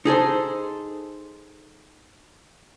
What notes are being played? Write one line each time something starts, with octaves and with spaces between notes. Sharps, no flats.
D#4 G#4 A4 C5